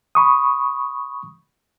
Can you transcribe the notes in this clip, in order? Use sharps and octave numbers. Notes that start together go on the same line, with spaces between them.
B5 C#6 D#6